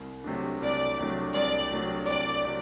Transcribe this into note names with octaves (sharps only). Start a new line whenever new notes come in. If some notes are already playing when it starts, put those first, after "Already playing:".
Already playing: C2
C3 F#3 A3 D4
C2 D5
C3 F#3 A3 D4
C2 D5
C3 F#3 A3 D4
C2 D5
C3 F#3